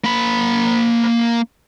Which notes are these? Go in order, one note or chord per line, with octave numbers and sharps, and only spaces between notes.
A#3 B5